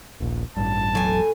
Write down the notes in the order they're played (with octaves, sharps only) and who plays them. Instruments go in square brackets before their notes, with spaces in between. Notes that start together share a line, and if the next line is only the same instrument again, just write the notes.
[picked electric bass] D#1 A#1
[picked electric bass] A1 G2 [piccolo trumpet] A5
[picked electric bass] E1 A1 F#3 [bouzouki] A2 G#5